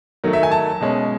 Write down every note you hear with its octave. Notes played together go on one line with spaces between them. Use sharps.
D#3 F#3 A3
E5
G#5
A5
B2 G#3 C#4